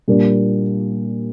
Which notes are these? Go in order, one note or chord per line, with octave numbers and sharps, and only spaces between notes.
A#2 G3 A#3 D4